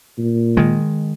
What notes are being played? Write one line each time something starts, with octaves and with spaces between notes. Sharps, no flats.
A#2
D#3 G#3